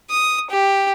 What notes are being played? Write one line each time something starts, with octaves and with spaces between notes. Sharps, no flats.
D#6
G4